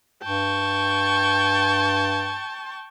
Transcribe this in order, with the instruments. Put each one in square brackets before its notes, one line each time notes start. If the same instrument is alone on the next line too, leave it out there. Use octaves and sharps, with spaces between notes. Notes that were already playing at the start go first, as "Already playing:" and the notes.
[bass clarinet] G2 [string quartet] G5 A5 C#6